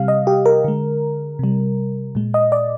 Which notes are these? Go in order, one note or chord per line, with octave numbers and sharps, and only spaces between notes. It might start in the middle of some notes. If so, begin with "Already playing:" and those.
Already playing: C3 G3 F5
D#5
G4
A#4
D3 G#3
C3 G3
A#2 G#3
D#5
D5